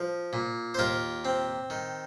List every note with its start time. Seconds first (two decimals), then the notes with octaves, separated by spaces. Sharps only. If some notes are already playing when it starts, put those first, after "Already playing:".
Already playing: F3
0.33 A#2
0.74 C5
0.79 D#2 F4 A#4
1.25 C4
1.70 D#3